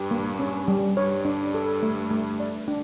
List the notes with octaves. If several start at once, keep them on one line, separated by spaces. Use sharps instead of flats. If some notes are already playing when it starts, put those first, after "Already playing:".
Already playing: G2 G4
A#3
C#4
G3
G2 C#5
D4
A4
A3
A3
D5
D4